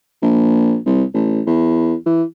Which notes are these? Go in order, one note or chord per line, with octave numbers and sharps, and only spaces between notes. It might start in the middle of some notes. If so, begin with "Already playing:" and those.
A#1
C2
A1
E2
E3